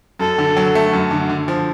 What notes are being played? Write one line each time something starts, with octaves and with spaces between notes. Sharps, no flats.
F#2 A4
D3
F#3
A3
F#2
D3
D3
F3